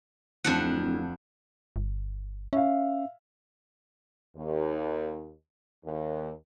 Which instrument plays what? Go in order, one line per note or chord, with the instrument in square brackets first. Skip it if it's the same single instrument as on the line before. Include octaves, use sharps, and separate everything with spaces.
[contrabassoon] D1 [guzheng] F2 D4 F#5
[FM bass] G1
[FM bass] C#4 [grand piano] E5 F5
[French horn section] D#2
D#2